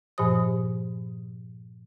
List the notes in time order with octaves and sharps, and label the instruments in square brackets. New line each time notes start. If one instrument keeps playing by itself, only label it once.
[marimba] G2 A#2 F3 G4 C5 D#6